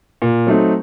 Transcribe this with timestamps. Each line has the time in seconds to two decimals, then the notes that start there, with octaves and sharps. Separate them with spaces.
0.22 A#2
0.47 F#3 A3 C4 D#4